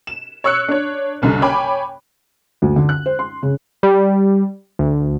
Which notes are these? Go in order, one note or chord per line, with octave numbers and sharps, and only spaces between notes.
E7
C#5 C#6 E6 F#6 C#7
D4 C#5
F#1 C2 F#2 D3
C#5 G5 G#5 B5 D6
D2
D3
F#6
C5
C6
C#3
G3
D2